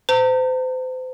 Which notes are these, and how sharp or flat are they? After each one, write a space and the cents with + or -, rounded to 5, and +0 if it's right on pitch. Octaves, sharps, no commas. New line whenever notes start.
C5 -35 A#5 -40